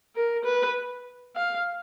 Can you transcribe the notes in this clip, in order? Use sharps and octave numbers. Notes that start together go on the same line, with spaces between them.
A#4
B4
F5